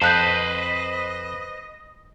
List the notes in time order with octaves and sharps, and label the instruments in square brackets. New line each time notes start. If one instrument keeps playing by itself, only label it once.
[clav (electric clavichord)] F2 F5 [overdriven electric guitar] B4 C5 [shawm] D#5 [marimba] A5 F#6 G6